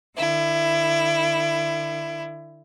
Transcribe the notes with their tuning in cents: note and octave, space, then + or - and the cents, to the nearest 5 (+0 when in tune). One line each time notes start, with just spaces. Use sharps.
D3 +45 E4 +20